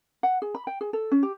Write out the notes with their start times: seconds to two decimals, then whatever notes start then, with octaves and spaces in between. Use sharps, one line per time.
0.23 F#5
0.42 G#4
0.55 B5
0.67 G5
0.81 G#4
0.93 A4
1.12 C#4
1.23 G4